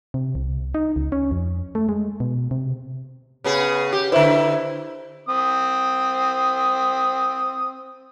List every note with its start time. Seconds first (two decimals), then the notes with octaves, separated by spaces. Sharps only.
0.14 C3
0.35 C2
0.75 D#4
0.96 C#2
1.12 C#4
1.31 F2
1.75 A3
1.89 G#3
2.20 B2
2.51 C3
3.44 C#3 B3 G#4
3.93 G4
4.12 D3 E4 B4 C5 E5
5.29 C4 D#6